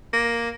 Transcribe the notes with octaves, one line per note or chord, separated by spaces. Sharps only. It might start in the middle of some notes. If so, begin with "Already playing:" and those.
A#3